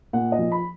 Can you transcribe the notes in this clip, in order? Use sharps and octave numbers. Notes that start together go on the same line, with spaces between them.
A#2 F#5
D#5
F3
B5